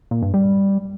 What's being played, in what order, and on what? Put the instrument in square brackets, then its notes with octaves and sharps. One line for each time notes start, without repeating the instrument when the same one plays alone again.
[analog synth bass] A#2
G2
G3